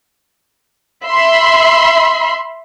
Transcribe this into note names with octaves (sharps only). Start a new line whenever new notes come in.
E5 B5 C6